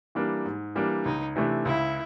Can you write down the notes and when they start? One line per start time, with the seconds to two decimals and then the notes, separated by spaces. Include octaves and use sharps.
0.15 E3 G3 A#3 D4
0.45 G#2
0.75 E3 G3 A#3 D4
1.05 C#2 D#4
1.36 C3 E3 A3 D4
1.65 C#2 E4